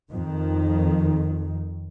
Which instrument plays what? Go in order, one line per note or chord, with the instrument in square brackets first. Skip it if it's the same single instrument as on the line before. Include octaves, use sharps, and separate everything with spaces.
[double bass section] F2 D#3